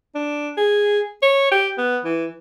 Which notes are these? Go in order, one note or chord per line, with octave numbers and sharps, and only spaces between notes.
D4
G#4
C#5
G4
B3
E3